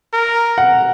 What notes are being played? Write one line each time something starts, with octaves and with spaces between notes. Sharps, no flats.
A#4
F#5